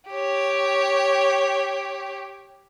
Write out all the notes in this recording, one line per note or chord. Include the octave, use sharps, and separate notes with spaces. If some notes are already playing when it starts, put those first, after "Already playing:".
G4 C#5